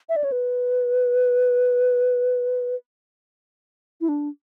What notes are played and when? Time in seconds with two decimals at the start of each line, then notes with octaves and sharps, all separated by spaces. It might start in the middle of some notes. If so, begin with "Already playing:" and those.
0.09 E5
0.16 D5
0.24 C#5
0.32 B4
4.01 E4
4.09 D4